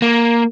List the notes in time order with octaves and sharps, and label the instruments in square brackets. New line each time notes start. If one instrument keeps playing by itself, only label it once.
[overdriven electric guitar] A#3